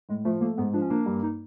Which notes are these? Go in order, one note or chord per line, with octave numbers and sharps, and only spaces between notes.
A2 G#3
F3 A3
A3 A#3
G#2 B3
F3 D4
C#4
A#3 D4
G2
D#4